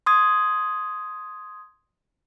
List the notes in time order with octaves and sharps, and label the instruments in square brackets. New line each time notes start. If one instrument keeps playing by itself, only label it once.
[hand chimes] C6 D#6 G#6